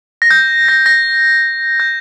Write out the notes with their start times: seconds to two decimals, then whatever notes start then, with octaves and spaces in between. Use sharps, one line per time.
0.22 A#6
0.31 G6
0.68 A#6
0.86 A#6
1.80 G6